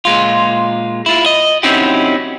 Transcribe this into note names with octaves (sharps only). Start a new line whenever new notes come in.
A#2 G#3 F4
E4 F4
D#5
C4 C#4 D#4 E4 F#4 G4